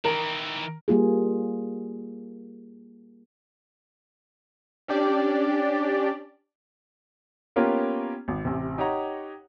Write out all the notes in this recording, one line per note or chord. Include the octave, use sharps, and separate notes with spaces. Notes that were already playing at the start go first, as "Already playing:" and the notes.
D#3 E3 A#4
G3 A#3 F4 G#4
C#4 D4 G4 D5
A#3 B3 C#4 F4 G4 A#4
G#1
A1 C3
D#4 G4 C#5 F#5 A#5